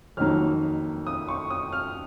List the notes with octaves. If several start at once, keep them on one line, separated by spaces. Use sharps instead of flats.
F2 D#3 F#3 A#3 D#4 F6
D#6
C#6
D#6
F6